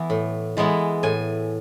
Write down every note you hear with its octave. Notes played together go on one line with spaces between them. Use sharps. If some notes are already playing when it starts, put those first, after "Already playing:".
Already playing: E3 B3 E4
A2
E3 G#3 B3 E4
A2 G#5